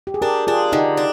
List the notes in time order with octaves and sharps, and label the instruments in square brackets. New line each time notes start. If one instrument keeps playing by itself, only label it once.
[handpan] G4
G#4
[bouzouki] D4 [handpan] G4 A#4
[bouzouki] D4 [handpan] F4 G#4
[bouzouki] D3 [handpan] D#4 G4
[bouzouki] D4